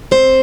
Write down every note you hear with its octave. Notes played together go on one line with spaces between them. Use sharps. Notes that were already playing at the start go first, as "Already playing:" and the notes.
C4 C5